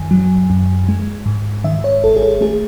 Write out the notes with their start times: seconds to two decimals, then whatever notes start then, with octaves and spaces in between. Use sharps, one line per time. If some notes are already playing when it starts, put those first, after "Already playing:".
Already playing: F#2 D#3 G#5
0.11 F#3
0.50 F#2
0.89 G#3
1.26 G#2
1.64 D#3 E5
1.84 C#5
2.04 G#1 A4
2.16 G#4
2.22 A4
2.41 A3 G#4